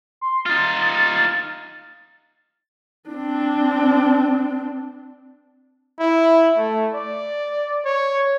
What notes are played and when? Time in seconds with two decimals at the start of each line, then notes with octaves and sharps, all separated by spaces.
0.21 C6
0.46 D#4 F4 A6
3.09 C4 D4
5.99 E4
6.57 A3
6.94 D5
7.85 C#5